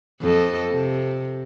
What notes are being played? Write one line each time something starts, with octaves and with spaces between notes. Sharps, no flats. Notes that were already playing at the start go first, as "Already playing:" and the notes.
F2 A4 D#5
C3